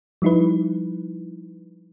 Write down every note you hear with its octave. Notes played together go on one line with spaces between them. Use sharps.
F3 G3 D#4 E4 B4